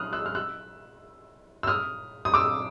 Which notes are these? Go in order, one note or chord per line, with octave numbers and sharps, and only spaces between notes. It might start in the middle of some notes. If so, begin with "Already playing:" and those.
Already playing: D#6 F6 F#6
E6 F#6
F6
E6 F#6
E6
D#6 F6
D#6
D6 E6